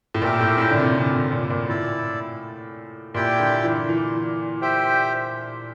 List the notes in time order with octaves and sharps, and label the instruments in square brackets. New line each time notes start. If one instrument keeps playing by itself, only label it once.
[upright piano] A2
[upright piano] A#2 [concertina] G4 A#4 E5 G5
[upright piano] A2
A2
D3
C3
C3
A2
A#2
A#2
[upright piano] A2 [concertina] E4 A4 D5
[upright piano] A#2 [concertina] E4 G4 D5 G5
[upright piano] D3
E3
E3
[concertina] G4 C5 E5 G5